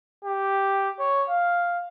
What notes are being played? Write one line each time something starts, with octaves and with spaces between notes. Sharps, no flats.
G4
C#5
F5